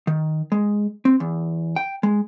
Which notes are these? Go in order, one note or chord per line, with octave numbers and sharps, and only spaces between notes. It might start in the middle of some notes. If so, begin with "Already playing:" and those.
D#3
G#3
C4
E2
G5
G#3